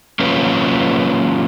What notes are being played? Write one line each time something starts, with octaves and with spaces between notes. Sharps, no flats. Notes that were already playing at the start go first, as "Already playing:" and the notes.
F#3 A#3 C#4 F4 B4